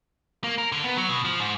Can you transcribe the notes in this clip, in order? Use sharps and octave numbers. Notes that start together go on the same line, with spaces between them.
A#3
A#4
D3
B3
F#3
B2
F3
G#2